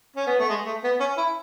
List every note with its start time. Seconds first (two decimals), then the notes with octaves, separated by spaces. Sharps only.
0.16 C#4
0.27 B3
0.39 A3
0.50 G#3
0.66 A3
0.84 B3
1.00 C#4
1.18 E4